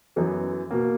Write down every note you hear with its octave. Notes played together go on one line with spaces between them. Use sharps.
F#2 E3 B3
B2 A#3